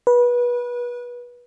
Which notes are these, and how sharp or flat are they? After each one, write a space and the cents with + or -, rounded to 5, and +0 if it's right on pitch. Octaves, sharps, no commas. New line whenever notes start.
B4 -25